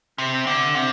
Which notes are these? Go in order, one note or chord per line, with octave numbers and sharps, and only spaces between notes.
C3
D3
C3